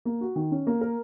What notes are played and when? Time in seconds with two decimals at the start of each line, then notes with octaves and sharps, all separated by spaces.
0.05 A#3
0.21 F#4
0.36 D#3
0.51 C#4
0.67 A#3
0.81 A#4